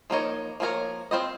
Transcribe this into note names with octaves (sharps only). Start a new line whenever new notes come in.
F3 A#3 D#4 A#4 C#5
F3 A#3 D#4 A#4 C#5
C4 F4 C5 D#5